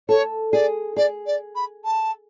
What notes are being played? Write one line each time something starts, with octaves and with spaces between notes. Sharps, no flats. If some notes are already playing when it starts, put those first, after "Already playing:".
A4 C#5
G#4 D5
G#4 D5
D5
B5
A5